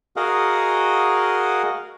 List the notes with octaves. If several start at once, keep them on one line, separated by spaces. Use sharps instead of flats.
F#4 G#4 A#4 D#5 F5 F#5